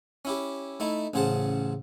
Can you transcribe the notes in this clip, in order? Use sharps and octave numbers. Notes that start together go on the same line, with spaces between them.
C#4 E4 G4
A3 D#4 E4
A1 C#3 G#4 C5 F#5 A5